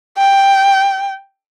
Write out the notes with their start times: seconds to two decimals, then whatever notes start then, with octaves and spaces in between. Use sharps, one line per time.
0.17 G5